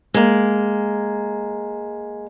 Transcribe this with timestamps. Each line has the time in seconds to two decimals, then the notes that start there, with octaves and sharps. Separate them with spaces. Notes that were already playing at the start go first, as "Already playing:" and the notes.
0.14 G#3 A#3